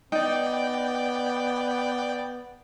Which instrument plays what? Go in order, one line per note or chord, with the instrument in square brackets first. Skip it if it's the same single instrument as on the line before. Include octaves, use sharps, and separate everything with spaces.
[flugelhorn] B3 [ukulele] D#4 [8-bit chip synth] D5 G5